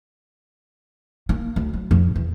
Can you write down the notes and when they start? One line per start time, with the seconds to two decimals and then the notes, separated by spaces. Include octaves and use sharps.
1.29 A#3
1.56 D2
1.73 F#3
1.91 F2
2.16 E2